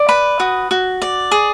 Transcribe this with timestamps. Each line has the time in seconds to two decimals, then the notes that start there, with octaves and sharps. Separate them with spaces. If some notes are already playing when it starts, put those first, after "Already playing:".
Already playing: D5
0.09 B4 B5
0.40 F#4 D#6
0.71 F#4
1.02 D5
1.31 G#4